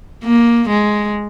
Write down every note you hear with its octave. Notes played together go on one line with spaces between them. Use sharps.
A#3
G#3